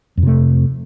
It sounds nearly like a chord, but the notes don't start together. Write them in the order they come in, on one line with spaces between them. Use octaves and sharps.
F2 C3 A3